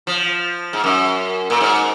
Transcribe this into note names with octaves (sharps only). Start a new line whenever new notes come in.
F3
G#2
F#2
A#2
G#2